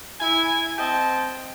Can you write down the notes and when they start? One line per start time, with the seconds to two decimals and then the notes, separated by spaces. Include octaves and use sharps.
0.21 E4 G#5
0.78 C4 D#5 G5 A5